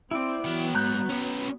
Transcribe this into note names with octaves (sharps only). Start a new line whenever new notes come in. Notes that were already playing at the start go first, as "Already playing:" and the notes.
C4 E4 D5
E3 F#3 B3 G5
G#2 A#5 F#6 G6
C#4 B4